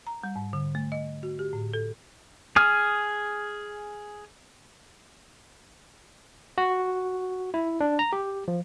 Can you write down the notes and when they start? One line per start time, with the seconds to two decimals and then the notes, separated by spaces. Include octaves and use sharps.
0.07 A#5
0.24 G3
0.36 G#2
0.53 D3
0.75 A3
0.92 D#5
1.23 F#4
1.39 G4
1.53 A2
1.73 A4
2.56 G#4 G#5 D#6 F6
6.58 F#4
7.54 E4
7.81 D4
7.99 A#5
8.13 G4
8.48 F3